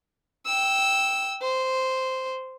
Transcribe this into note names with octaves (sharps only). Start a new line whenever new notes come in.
G5 E6
C5